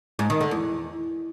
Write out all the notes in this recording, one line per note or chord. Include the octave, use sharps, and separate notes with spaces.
G#2
D#3
D3
E2